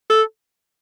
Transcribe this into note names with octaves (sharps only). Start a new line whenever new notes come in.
A4